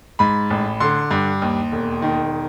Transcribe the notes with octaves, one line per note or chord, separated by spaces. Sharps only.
G#2 B5
A1
D3 C6
G2
D#2
E1
D#3